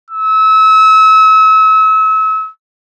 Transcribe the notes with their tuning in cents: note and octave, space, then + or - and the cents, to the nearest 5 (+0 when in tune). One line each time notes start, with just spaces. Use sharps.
E6 -35